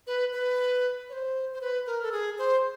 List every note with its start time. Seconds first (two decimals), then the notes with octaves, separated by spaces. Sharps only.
0.07 B4
0.33 B4
1.09 C#5
1.13 C5
1.53 C5
1.61 B4
1.87 A#4
2.03 A4
2.12 G#4
2.38 C5